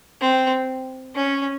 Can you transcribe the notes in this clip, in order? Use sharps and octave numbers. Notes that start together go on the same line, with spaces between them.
C4
C#4